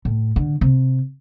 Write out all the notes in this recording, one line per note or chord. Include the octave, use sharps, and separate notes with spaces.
A2
D3
C3